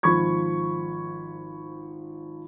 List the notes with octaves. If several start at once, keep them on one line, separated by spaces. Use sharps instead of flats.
G#1 F3 B5 C#6 G#6